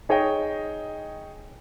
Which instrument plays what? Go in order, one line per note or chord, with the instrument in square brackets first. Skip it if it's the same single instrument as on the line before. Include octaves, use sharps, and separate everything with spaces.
[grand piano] D#4 G#4 C#5 D#5 G5